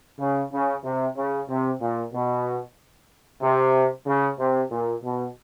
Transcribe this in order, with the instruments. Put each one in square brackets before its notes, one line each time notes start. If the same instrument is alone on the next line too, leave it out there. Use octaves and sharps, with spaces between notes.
[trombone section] C#3
C#3
C3
C#3
C3
A#2
B2
C3
C#3
C3
A#2
B2